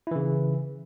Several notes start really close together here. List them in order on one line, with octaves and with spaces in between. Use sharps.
E4 E3 C#3